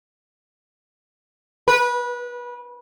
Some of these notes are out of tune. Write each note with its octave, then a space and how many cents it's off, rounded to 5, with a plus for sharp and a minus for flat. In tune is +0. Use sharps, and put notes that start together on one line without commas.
B4 -25